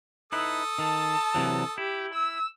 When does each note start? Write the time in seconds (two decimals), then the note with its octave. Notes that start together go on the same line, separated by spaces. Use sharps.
0.32 D#4 E4 A4 B4 D#6
0.78 D#3 A5
1.35 C3 E3 F#3
1.78 E4 G4
2.14 E6